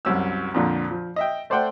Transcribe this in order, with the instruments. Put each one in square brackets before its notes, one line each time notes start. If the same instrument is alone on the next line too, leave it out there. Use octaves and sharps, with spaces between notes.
[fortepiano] C2 F#2 E6
F2 A#2 D3 F3
F3
D#5 E5 G5
A3 C5 D5 F#5 G5